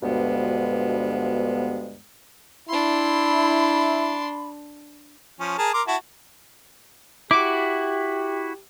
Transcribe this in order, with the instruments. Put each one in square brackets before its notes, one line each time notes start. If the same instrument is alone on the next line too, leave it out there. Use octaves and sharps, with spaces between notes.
[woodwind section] D2 G2 B2 F3 G#3 B3
[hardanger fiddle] D4 C6 [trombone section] E4 [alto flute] B5
[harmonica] F3 C#4
G#4 A#4 A5
A#4 C6 D6
E4 F#4 A5
[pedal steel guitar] E4 F#4 [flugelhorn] G4 [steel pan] D6